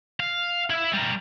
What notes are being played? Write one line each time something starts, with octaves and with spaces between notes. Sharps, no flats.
F5
E4 E5
G3 A#4